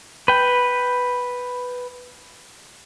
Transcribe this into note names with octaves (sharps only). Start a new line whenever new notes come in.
B4 G5